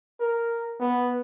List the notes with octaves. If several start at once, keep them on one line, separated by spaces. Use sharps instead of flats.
A#4
B3